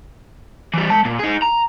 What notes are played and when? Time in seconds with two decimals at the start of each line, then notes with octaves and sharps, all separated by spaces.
0.74 E3 G3
0.90 G#3 A5
1.05 A#2
1.19 D#4 G#4
1.42 A#5